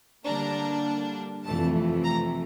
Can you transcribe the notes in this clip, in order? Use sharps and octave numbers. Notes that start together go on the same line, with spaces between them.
D3 G3 A#3 D4 A#5
F2 C3 E3 A3 A5
A#5